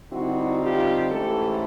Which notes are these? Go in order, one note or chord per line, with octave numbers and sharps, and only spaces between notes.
D3 G3 C4 D#4 E4 F#4
F4 G4
G#2 E3 A3 C#4 G4 A4